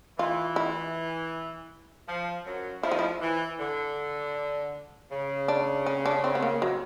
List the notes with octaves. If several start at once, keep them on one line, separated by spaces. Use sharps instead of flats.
E3 F4
E4
F3
F#2 F#3
F3 E4
D#4
E4
E3
D3
C#3
D4
C#4
D4
C4
B3
A#3
F#3